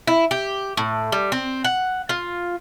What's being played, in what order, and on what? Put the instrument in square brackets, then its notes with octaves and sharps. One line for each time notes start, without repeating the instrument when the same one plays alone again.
[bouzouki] E4
G4
A2
G3
C4
F#5
F4